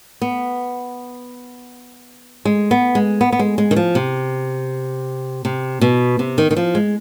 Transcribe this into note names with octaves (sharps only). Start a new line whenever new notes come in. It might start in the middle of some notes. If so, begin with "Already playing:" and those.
B3
G#3
B3
G#3
B3
B3
G#3
G#3
D#3
F3
C3
C3
B2
C3
D#3
D#3
F3
G#3